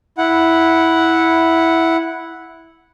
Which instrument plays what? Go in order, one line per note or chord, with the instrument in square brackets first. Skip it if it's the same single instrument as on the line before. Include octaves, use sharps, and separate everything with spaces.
[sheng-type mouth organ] E4 F#5